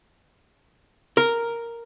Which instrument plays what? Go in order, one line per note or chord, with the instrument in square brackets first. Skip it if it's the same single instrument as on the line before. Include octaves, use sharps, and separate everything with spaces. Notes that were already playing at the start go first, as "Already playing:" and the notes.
[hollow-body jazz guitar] A#4